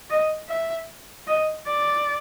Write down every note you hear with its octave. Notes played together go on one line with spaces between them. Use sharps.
D#5
E5
D#5
D5